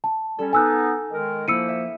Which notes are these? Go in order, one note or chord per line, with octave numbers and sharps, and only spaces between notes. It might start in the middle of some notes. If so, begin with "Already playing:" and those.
A5
G3 C#4 A4
B3 D#4 G#5 E6 F#6
D#3 G#3 A#4
F3 A#3 E4 E6 C#7 D#7
E5